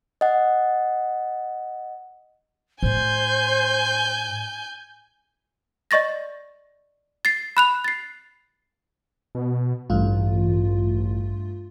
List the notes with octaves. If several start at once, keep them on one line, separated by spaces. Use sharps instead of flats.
D#5 F#5
A2 C5 G#5 G6
D5 D#5 C#6 A6 A#6
A6 C7
B5 F#6 F7
A6 C7
B2
A1 G2 A3 F4